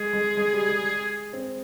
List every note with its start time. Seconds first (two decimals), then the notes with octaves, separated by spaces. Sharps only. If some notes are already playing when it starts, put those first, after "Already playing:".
Already playing: G#3 G#4
0.13 G#3
0.37 G#3
0.53 G3
0.69 G#3
1.33 C4